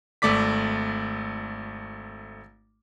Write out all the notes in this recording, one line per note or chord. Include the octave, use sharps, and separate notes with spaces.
G#1 A3 D5 D6 B6